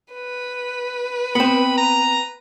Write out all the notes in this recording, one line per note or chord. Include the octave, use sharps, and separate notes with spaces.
B4
B3 C4 B5
A#5